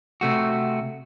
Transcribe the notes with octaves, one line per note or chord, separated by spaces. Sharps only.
C3 A3 F#4